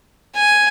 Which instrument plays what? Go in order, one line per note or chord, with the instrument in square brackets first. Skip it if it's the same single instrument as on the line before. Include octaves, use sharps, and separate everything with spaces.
[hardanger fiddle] G#5